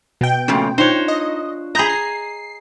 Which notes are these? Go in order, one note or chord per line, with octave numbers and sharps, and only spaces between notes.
B2 G5
F2 A#2 C#3 A3 C#4
D4 D#4 F4 C5 C#5 F#6
D#5
G#4 D#5 A#5 B5 G6 A#6
C7